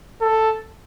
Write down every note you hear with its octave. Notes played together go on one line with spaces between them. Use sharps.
A4